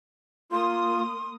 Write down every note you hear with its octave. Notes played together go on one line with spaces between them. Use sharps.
A#3 F4 C6 D#6